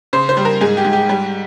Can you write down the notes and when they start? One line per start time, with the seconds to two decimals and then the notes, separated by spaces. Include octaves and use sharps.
0.13 C#3 C5
0.29 C5
0.37 G3
0.45 A#4
0.61 G#2 G#4
0.77 G4
0.85 G#2
0.93 G4
1.09 G3